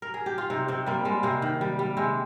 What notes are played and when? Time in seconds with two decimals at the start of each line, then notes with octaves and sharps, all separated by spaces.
0.02 A#4
0.14 G#4
0.26 G4
0.38 F4
0.50 C3 D#4
0.68 C3 C4
0.86 G3 A#3
1.05 G3 G#3
1.23 C3 A#3
1.42 D#3
1.61 G3
1.79 G3
1.97 C3 G#3